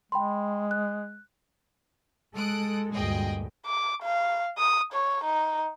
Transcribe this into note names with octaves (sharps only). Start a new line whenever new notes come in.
G#3 G5 B5 C6
F#6
G#3 A4 D#6 F#6 D7
D2 G2 A#2 G#4 D#5 G5
D6
F5
D#6
C#5
D#4